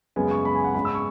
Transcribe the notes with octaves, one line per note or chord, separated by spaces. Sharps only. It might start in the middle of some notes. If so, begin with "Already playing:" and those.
F#2 C#3 G#3 B3 G#5
C#6
B5
G#5
F#5
G#2 G#3 C#4 B5
E6
C#6